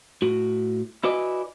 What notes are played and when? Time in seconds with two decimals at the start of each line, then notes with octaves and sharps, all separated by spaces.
0.22 A2 F#4
1.04 E4 F#4 B4 D5 D#5 G#5